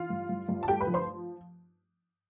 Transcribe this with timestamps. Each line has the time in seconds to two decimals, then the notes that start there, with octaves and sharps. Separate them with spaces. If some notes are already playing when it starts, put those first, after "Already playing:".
Already playing: E3 F4 F5
0.10 G2
0.29 G2
0.49 G2
0.63 A5
0.68 A3 G4 G5
0.81 B4 B5
0.87 F3
0.94 C5 C6